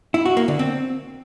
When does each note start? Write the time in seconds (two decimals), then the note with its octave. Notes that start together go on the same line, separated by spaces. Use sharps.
0.14 E4
0.25 F#4
0.37 A#3
0.48 D3
0.59 C4